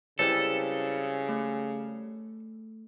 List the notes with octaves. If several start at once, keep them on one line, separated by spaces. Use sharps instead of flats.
C#3 G3 G#3 C4 E4 A4 B4 C#5
A3